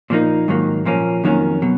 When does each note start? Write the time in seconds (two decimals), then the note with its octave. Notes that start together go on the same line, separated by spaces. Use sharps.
0.10 A#2 F3 A#3 D#4
0.48 G#2 D#3 F#3 A#3
0.85 A#2 F3 A#3 C#4
1.24 F2 D#3 F#3 A#3 C#4
1.62 B2 F#3